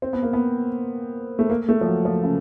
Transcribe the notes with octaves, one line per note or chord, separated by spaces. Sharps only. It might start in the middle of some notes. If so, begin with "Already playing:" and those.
C4
B3
A#3
B3
A3
A#3
A3
F3
F#3
F3
C#3